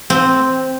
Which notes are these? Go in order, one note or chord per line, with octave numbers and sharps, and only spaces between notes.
C4